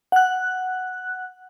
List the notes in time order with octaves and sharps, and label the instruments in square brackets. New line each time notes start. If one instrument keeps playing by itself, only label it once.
[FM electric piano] F#5 F#6